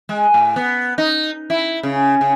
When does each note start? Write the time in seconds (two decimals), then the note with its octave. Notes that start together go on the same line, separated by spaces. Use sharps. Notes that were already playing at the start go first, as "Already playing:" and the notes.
0.09 G#3
0.34 A2
0.56 B3
0.98 D#4
1.50 E4
1.83 C#3
2.21 C#3